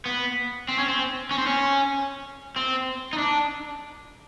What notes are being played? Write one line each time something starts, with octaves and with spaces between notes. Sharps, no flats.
B3
C4
C#4
C4
C#4
C4
C#4
C4
D#4
D4